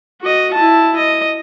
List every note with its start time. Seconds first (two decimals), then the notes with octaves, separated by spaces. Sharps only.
0.21 F#4 D#5
0.54 E4 A5
0.96 D#5